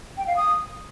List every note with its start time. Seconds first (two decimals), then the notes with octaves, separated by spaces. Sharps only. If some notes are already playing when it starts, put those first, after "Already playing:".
0.18 G5
0.27 F5
0.37 D#6